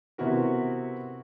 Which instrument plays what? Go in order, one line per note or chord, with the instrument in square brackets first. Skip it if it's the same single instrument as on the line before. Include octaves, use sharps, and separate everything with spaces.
[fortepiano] C3 B3 E4 F#4 A#4